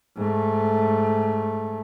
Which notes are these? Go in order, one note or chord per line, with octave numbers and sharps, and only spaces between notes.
G#2 A3